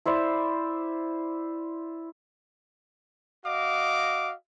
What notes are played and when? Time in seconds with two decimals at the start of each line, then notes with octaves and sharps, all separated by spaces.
0.06 E4 C5 D5 E5
3.44 F#4 D#5 F5 D6